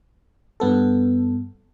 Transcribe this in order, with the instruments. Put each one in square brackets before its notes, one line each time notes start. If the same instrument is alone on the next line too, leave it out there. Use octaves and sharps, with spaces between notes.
[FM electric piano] G2 B3 A4